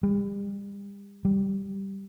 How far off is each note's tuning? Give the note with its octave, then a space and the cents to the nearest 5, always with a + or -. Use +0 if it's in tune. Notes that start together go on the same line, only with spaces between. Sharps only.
G3 +40
G3 -5